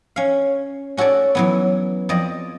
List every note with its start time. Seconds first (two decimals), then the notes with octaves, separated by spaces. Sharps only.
0.16 C#4 F5
0.97 C#4 F#4 A4 C#5 D5
1.35 E3 F#3 B3
2.09 F2 D5 D#5